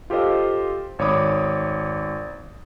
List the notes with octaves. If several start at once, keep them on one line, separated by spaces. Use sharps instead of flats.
F4 G4 A4 C5 D#5 F5
G#1 C#5 D5 B5 D6 D#6